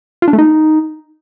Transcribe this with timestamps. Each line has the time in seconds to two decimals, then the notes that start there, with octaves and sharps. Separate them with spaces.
0.22 F4
0.28 D4
0.33 A3
0.38 D#4